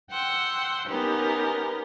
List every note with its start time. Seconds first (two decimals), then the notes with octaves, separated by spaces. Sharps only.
0.10 F#5 G5 C6 E6
0.89 B3 C#4 D#4 G4 A#4